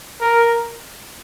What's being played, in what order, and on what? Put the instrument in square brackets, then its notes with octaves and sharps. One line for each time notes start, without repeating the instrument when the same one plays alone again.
[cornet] A#4